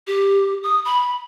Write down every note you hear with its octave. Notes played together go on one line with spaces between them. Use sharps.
G4
D#6
B5